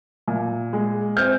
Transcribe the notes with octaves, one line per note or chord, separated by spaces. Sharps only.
A#2
G#3
C4 F6 G6